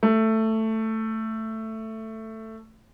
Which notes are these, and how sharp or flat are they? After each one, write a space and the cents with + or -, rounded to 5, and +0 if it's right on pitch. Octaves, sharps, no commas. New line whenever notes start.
A3 +10